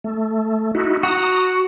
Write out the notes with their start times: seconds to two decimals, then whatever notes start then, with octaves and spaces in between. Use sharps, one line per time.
0.04 A3
0.75 D#4 E4 F#4
1.03 F#4 A#5 D#6